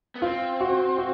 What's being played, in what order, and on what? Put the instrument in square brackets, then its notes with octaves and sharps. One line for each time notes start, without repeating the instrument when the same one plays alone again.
[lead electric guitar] B3
[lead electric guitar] C4 [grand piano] F4
[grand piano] F#4
F#4